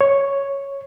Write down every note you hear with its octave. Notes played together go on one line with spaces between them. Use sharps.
C#5